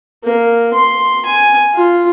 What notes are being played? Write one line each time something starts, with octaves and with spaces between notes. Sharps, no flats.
A#3
C6
G#5
F4